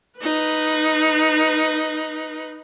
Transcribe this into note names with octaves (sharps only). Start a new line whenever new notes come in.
D#4 B4